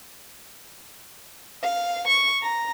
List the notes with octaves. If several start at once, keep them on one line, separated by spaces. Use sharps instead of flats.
F5
C#6
A#5